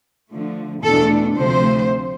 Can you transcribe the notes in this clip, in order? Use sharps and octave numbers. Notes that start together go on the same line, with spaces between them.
D3 F3 A3
E2 B2 A3 D4 A4
D2 C3 F3 A3 C5